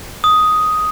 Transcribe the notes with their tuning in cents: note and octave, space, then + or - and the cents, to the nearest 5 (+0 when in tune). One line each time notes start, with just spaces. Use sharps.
D#6 +5